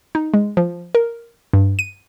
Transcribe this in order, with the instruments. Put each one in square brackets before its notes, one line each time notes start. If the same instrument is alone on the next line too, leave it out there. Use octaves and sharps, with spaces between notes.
[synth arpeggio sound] D#4
G#3
F3
A#4
G2
D#7